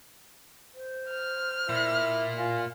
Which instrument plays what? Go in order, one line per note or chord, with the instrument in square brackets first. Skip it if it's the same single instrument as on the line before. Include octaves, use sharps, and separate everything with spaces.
[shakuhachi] C5
[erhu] F6
[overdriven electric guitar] A#2 [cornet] E4
[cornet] F4 [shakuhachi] G#5